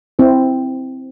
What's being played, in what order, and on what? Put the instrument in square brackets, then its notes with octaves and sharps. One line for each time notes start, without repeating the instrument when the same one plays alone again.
[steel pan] C4 E4 C5